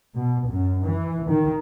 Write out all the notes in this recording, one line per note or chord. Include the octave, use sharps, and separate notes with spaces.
B2
F#2
E3
D#3